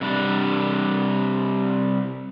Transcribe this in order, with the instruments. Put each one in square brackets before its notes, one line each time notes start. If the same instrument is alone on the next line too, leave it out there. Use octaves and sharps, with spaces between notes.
[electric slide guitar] C3 G3 D4